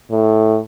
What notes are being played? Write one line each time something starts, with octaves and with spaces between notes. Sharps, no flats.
A2